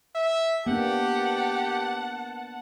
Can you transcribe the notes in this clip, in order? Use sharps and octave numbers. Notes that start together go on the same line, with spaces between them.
E5
A#3 B3 D4 G4 F#5 A5